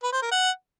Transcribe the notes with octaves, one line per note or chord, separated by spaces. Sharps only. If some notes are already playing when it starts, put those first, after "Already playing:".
B4
C5
A#4
F#5